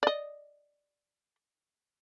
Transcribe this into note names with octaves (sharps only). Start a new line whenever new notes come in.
D5 D#5